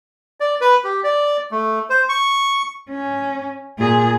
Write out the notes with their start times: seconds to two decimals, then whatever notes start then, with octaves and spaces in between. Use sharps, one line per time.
0.40 D5
0.61 B4
0.84 G4
1.04 D5
1.51 A3
1.90 C5
2.09 C#6
2.90 C#4
3.79 A#2 G#4